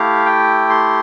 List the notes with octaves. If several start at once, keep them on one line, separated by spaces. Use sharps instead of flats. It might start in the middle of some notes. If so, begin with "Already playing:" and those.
Already playing: A3 E4 G4 F5
G5
C6